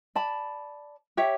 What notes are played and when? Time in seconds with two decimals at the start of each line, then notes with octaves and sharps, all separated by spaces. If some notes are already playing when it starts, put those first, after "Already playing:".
0.15 D5 A5 B5
1.17 G4 C#5 E5